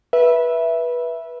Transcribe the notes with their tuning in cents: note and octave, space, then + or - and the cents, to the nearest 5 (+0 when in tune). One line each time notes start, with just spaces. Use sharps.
B4 -20 E5 +0